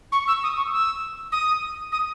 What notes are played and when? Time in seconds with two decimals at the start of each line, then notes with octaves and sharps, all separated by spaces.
0.12 C#6
0.27 E6
0.43 D#6
0.57 C#6
0.72 E6
1.32 D#6
1.92 D#6